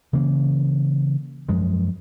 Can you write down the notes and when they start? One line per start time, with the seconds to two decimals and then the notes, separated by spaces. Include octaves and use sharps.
0.13 C#3 E3 A#3
1.49 F#2 F3 G#3